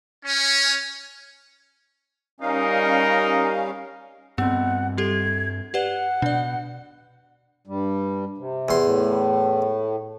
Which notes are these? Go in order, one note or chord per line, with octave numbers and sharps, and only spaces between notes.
C#4
G3 C#4 D#4 A#4 F5
G2 B3 C4 F#5
G3 G4 A4 G#6
G4 B4 D5 F#5
B2 D4 D5
G2 G3
C3
E2 C6
A2